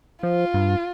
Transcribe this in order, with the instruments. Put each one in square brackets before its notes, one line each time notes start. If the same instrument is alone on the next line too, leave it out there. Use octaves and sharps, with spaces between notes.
[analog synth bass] F3 [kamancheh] F4
[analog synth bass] G2